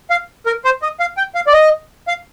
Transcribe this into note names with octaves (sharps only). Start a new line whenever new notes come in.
F5
A#4
C5
D#5
F5
G5
F5
D5
D#5
F5